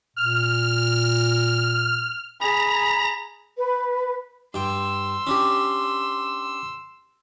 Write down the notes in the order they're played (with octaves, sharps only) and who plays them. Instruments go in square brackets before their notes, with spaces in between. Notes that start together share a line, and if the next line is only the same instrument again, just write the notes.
[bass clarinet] A#2 [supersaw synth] F6
[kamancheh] G#4 [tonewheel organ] A#5 [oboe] B5
[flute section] B4
[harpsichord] G2 G5 [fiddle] C6 E6
[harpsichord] C#4 D4 G4